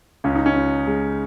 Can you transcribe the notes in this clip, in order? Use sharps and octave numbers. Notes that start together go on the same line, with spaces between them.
C#2 C#4
D#4
C#4
C#2
G#3